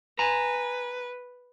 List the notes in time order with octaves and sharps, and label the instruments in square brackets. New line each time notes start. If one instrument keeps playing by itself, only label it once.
[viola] B4 [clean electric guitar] G#5 A#5